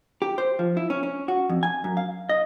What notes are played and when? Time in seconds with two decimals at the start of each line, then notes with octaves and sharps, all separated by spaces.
0.22 G4
0.38 C5
0.59 F3
0.77 E4
0.90 C#4
1.03 C#4
1.28 F#4
1.49 F2
1.63 G#5
1.84 F#2
1.97 F5
2.29 D#5